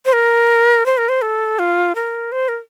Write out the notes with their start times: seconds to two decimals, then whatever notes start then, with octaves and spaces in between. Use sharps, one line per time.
0.06 C5
0.13 A#4
0.86 C5
0.98 A#4
1.09 C5
1.22 A4
1.59 F4
1.95 A#4
2.32 C5
2.48 A#4